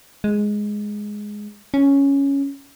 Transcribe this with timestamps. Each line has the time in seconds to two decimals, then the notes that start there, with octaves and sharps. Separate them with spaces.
0.24 G#3
1.74 C#4